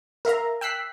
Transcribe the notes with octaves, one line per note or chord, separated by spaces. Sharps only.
A#4 E5 F5 A#5
G5 E6 F#6 B6 C7